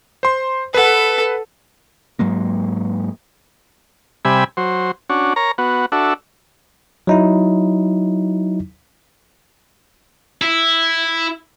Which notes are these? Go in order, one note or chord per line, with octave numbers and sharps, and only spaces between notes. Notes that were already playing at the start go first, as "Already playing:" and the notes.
C5 C6
A4 B4 F#5
G#2 F#3 G#3 A#3
C3 G3 E5 G#5 B5
F#3 C5
C#4 D4 F#4
A#4 C#5 A#5
B3 F#4
D4 F#4 A4 E5
F#3 D#4 E4
E4